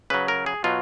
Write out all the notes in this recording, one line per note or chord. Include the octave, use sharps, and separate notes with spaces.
C#3 F#3 B4
A#4
G#4
B2 F#3 F4